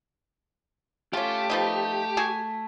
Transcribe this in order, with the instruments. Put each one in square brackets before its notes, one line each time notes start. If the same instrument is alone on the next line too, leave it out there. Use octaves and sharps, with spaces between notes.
[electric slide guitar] A3 [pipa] C#4 F4 [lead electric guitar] G4
[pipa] F3 B3 D#4
F#4 G#4 G#5